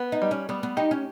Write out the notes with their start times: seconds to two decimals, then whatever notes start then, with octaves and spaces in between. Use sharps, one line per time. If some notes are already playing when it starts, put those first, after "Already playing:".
Already playing: B3
0.12 D#4
0.22 G3
0.31 C#4
0.49 G3 B3
0.63 B3
0.77 D#4 G4
0.91 C#4